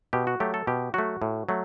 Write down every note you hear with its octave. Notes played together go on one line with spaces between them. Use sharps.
B2 G4
F#4
F#3 A3 G4
A4
B2 G4
F#3 A3 F#4
A2
F#3 A3